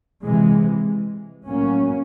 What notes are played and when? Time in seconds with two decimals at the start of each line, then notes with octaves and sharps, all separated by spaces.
0.23 C3 E3 G#3
1.47 A2 F#3 A#3 C#4